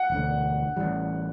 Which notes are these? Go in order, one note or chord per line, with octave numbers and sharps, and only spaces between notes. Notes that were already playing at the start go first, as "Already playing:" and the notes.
Already playing: F#5
E1 D2 D3
A1 A2 E3 G3